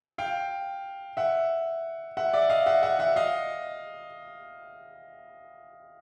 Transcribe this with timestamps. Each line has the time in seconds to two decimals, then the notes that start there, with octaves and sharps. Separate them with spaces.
0.18 F5 G5
1.17 E5 F#5
2.17 E5 F#5
2.33 D5 E5
2.50 D#5 F5
2.66 E5 F#5
2.83 E5 F#5
2.99 E5 F#5
3.16 D#5 F5